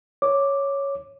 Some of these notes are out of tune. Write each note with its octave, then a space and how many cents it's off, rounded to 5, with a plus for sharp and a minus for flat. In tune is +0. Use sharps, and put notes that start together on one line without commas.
C#5 +0 D6 +0